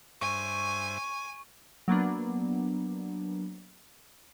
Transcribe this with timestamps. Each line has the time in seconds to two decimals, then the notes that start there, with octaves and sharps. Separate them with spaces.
0.21 G2 C5 E5 G#5 C#6
1.88 F#3 A#3 B3 D4